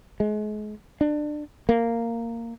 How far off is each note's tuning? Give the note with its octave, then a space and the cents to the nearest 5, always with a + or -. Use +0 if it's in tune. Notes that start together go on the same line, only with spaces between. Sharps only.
G#3 +35
D4 +25
A#3 -10